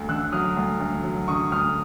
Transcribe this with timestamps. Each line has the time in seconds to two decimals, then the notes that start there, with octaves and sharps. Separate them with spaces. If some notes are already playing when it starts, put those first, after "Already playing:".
Already playing: D2
0.09 D3 E6 F#6
0.32 F#3 D#6 F6
0.57 D2
0.80 D2
1.04 F#3
1.28 D3 C#6 D#6
1.51 D2 D#6 F6